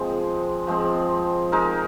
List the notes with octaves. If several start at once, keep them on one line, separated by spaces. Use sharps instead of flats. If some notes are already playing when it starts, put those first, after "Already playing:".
Already playing: F3 G#3 C4
F3 G#3 C4
G#3 D#4 A#4